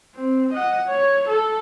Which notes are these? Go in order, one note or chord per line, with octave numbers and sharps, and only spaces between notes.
C4
D#5 F#5
C#5
A4